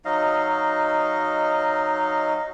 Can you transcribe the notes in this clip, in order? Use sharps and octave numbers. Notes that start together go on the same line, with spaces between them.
F#3 D#4 D#5 F5